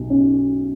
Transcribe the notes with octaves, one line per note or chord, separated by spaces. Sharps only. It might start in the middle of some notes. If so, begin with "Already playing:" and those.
Already playing: B1
C#4